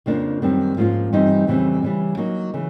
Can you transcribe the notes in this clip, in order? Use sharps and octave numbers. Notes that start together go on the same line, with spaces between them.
F2 C#3 F3 A#3 D4
F#2 D#3 G3 C4
G#2 F3 A#3 C#4 F4
G2 E3 G3 C4 D#4
F2 C#3 E3 G3 C4
C#3 E3 G3
F#3 A#3 D#4
C#3 E3